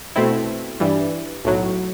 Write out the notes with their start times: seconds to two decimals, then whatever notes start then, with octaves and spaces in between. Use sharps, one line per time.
0.16 B2 A3 C4 E4
0.80 G2 E3 G3
1.45 B1 A2 F#3